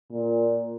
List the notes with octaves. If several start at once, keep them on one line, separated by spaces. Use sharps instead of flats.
A#2